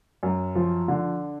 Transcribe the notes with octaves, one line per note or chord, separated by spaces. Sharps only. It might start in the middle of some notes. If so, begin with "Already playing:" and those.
F#2
F3
D3